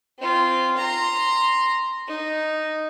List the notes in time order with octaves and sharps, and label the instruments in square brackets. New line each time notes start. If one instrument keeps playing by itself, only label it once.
[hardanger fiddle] C4 F4
A#5 C6
D#4